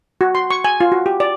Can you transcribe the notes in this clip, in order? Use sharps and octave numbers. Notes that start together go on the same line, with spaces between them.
F#4
C6
C#6
G#5
F4
F#4
G4
D5